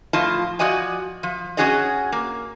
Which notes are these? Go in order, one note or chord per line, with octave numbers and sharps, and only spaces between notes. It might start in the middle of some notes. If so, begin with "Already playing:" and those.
A2 F3 F4 D#5 A5
F3 F#4 D5 D#5 G#5
F3
C#4 D#4 F#4 G#4 C#5 D#5
A#3